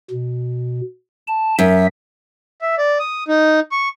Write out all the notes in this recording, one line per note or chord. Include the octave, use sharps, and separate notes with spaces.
B2
A5
F#2 E5
E5
D5
D#6
D#4
C#6